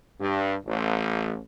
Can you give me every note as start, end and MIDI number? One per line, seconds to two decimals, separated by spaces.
0.21 0.55 43
0.66 1.38 33